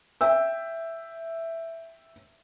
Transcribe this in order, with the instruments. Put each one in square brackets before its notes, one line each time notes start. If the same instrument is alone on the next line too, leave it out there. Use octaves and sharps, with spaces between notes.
[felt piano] E5 G5 E6